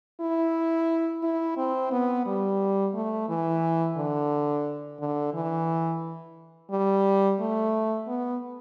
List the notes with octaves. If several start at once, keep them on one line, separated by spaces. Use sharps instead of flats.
E4
E4
C4
B3
G3
A3
E3
D3
D3
E3
G3
A3
B3